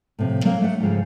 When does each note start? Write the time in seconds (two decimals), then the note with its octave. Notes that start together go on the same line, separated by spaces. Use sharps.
0.19 A2 C3 F3
0.45 F#3 A#3 C4 A#4
0.62 A3 D4 F#5
0.80 G#2 C#3 F3 G#3 A3 G5